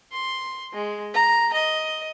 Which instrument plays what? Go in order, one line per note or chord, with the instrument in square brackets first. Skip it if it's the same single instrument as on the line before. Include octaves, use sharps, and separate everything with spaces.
[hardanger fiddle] C6
G#3
A#5
D#5